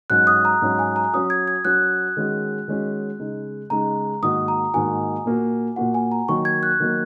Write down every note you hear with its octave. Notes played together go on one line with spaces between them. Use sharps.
G#2 F#3 C#4 F#6
D#6
A#5
G#2 F#3 C#4
G#5
A#5
F#3 C#4 F#4 D#6
G#6
G#6
F#3 C#4 F#4 F#6
D#3 G#3 C#4 F#4
D#3 G#3 C#4 F#4
C#3 G#3 D#4
C#3 G#3 D#4 A#5
G#2 D#3 A#3 F#4 D#6
A#5
G#2 D#3 A#3 F#4 G#5
A#2 A#3 F#4
A#2 A#3 F#4 F#5
G#5
A#5
D#3 F#3 A#3 C#6
G#6
F#6
D#3 F#3 A#3